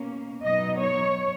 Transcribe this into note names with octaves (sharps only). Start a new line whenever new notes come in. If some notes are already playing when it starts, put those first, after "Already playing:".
Already playing: B2 A#3 C#4
B2 F#3 B3 D#4 D#5
C#5